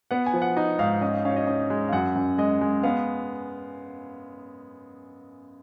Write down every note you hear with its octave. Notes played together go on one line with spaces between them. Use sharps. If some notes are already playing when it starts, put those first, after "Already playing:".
B3 F#5
G#5
F3
F#5
D#4
G#2 F5
C#4 D#5
F5
C#4 F5
C#5
D#5
C#4 D#5
G#3
F5
F#2 F#5
F#2
G#3 D#5
G#3
B3 F5